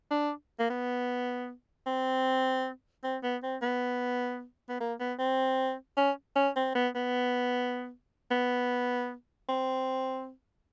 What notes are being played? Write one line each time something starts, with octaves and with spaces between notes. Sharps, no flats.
D4
A#3
B3
C4
C4
B3
C4
B3
B3
A#3
B3
C4
C#4
C#4
C4
B3
B3
B3
C4